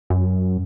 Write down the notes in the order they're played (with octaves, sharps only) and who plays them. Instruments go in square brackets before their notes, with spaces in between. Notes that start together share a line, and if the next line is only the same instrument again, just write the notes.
[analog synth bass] F#2